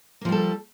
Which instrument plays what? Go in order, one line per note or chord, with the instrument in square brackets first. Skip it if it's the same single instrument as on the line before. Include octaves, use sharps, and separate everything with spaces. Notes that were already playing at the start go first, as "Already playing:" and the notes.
[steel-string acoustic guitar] A#3
F3
G3
A4